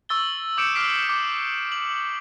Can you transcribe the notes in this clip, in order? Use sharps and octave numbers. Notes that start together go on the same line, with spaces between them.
C#6 E6 A6 G7
D6 D#6 G6 C#7 D7 E7
D6 E6 F6 B6 C7 D7
D6 E7
F#7